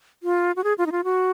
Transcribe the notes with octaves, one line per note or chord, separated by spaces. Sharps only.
F4
F#4
G#4
F4
D#4
F4
F#4